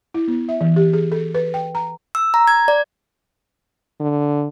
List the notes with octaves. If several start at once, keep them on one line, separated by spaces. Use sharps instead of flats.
E4
B3
E5
E3
G4
G#4
A4
B4
G5
A#5
E6
A#5
G#6
D5
D3